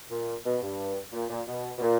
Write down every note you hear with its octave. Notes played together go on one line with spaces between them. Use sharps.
A#2
B2
G2
A#2
A#2
B2
B2
A#2